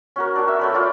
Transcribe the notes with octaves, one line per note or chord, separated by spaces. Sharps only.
C#4 F#4 A#4
D4 F#4
E5
A3 C#4 B4
C#4 F4 D5 G5